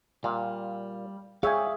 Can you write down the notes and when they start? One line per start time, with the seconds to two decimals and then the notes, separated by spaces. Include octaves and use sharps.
0.24 A#2 G3 F5
1.43 G#4 C#5 D5 E5 F5 G5 G#5